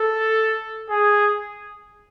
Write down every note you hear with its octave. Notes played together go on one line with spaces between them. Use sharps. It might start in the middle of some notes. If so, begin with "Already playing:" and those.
Already playing: A4
G#4